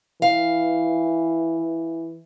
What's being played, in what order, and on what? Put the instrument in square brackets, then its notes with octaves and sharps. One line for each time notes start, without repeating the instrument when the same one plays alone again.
[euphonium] E3 [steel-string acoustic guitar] F5